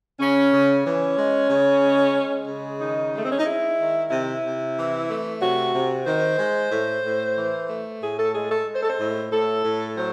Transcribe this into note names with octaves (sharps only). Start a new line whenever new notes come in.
C#3 C#4
C#3
E3 C#4
G#3
C#3
G#3
G#3
C#3
D#3 D#4
G#3 A3
C4
C#4
D#4
G#3 E4
D#3
C3 E4
C3
E3
A3
C3 F#4
C3
D#3 C5
G#3
A2
A2
E3
A3
A2 G#4
A4
G#3 G#4
A4
G#3
C5
A4
C5
A2
A2 A4
A2
F#3 C5